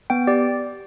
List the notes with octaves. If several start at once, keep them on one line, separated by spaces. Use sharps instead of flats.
B3 G5
G4 D5